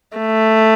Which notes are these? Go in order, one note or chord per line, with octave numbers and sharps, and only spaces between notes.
A3